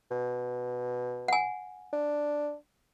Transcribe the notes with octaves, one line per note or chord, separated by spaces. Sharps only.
B2
F#5 G#5
D4